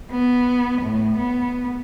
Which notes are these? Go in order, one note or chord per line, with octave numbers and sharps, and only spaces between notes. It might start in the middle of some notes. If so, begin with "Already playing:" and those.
B3
A2
B3